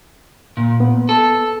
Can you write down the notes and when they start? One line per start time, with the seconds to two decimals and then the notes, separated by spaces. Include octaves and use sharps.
0.57 A#2
0.80 B3
1.09 A4